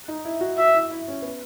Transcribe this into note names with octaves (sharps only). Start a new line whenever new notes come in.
D#4
E4
F#4
F#4 E5
E4
E4
C#4
B3